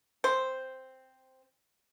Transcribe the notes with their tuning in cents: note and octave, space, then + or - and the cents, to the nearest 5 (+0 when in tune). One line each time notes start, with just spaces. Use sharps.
C4 +0 C5 +0